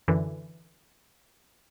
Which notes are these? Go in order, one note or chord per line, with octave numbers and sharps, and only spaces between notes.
F#2 D3 E3